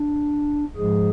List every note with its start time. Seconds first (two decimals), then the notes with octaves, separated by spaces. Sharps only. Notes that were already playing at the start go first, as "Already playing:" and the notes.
Already playing: D4
0.77 G#2 F3 G#3 G#4